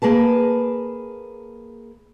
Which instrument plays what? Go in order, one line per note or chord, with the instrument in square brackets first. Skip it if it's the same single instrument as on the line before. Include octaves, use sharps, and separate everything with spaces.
[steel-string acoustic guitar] A#3 G#4 B4 A5